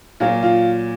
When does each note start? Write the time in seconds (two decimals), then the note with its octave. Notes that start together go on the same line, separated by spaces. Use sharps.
0.20 A#2 F#3 F4
0.43 F4